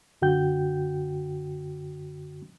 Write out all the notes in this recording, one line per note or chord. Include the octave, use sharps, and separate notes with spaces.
F#2 D3 F#4 G5 G6